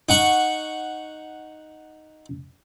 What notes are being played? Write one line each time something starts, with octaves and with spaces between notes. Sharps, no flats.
D#4 F#5 C#6